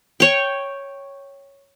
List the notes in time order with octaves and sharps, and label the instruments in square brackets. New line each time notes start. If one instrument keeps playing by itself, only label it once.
[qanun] C#5 G5